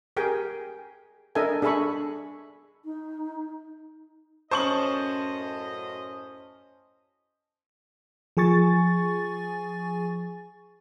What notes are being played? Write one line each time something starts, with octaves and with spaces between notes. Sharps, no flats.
G4 G#4 A#4 G5 G#5
D4 A4 A#4 D#5 E5 G#5
D4 G#4 A4 E5 B5 C#6
D#4
F#2 A2 C#4 C5 D#5 A5 C#6 F#7
F3 G#4 G#5 C#6 A6